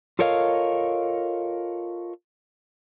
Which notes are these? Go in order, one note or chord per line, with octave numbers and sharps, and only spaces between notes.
F4 A4 A#4 C#5 D#5 F5